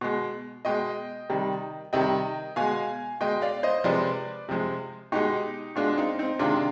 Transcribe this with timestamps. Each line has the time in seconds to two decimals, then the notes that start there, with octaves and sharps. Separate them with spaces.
0.01 B2 G#3
0.65 B2 G#3 D#5 G5
1.30 C3 D#3 G3
1.93 C3 D#3 G3 D#5 G5
2.56 B2 G#3 F5 G#5
3.21 B2 G#3 D#5 G5
3.42 D5 F5
3.63 C5 D#5
3.84 C3 F3 G#3 B4 D5
4.49 C3 F3 G#3
5.12 B2 G#3 D#4 G4
5.75 B2 G#3 D4 F4
5.97 C4 D#4
6.19 C4 D#4
6.39 C3 D#3 G#3 D4 F4